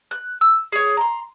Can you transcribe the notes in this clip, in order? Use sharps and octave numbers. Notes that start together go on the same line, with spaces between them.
F#6
E6
G#4 C#5
A#5 C6